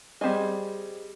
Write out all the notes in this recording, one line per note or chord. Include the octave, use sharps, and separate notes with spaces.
G3 C4 F4 G#4 D#5